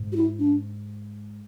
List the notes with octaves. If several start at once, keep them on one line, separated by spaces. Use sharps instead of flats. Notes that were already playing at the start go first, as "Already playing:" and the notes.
Already playing: G#2
F#4
E4
D4